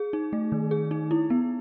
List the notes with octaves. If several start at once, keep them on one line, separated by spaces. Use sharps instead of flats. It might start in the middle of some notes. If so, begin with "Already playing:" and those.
Already playing: G#4
D#4
A3
D#3
G#4
D#4
E4
B3